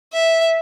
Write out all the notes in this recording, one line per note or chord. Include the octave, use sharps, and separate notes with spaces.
E5